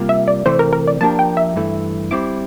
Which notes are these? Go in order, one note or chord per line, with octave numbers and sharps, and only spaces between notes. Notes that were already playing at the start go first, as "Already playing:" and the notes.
Already playing: C3 G3 A#3 F4
E5
D5
C3 E3 A3 C4 C5
A#4
A#4
D5
F3 A#3 D4 G4 A#4 A5
G5
E5
G2 E3 A3
G3 C4 E4 D6